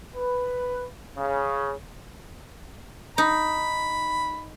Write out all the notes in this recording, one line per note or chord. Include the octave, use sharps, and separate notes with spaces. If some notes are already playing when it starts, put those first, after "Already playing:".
B4
C#3
D#4 B5